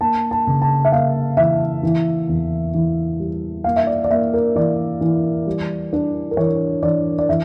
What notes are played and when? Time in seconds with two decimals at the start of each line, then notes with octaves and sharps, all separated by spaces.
0.01 A#3 A5
0.31 A5
0.47 C#3
0.62 A5
0.85 E5
0.92 A#3 F5
1.37 E3 E5
1.83 E3
2.29 E2
2.74 E3
3.20 G3
3.64 A#3 F5
3.76 E5
3.87 D5
4.04 D5
4.10 A#3 E5
4.34 A#4
4.55 E3 D5
5.01 E3
5.47 G3
5.93 D4
6.31 A#4
6.37 E3 C#5
6.83 E3 D5
7.19 D5
7.29 E3 E5